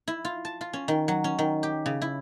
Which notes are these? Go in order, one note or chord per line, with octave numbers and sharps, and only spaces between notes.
E4
F4
A5
F4
C#4
D#3
F#3
C#4
D#3
G4
C#3
E4